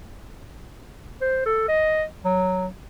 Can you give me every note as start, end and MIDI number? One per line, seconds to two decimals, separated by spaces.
1.21 1.44 72
1.46 1.67 69
1.68 2.04 75
2.25 2.67 54